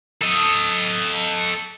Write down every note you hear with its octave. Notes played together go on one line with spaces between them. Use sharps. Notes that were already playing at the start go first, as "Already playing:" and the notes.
A4 D#5